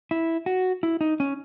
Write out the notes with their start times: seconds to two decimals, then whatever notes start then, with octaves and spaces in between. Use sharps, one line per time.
0.11 E4
0.46 F#4
0.83 E4
1.01 D#4
1.20 C#4